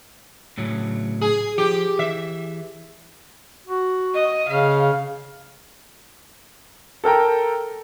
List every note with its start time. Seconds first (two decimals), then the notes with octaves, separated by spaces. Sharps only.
0.58 A2 C#3 F#3
1.21 G#4
1.58 F3 G4
1.99 E3 E5
3.66 F#4
4.14 D#5
4.48 C#3 F5
7.04 A4 A#4 G5 A#5